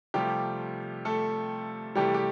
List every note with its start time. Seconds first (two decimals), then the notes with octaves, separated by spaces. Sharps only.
0.14 C3 F3 G3 A3 G4
1.05 A3 A4
1.95 C3 E3 G3 A3 G4
2.14 G4